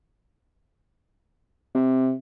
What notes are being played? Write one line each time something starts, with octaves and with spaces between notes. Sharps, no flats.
C3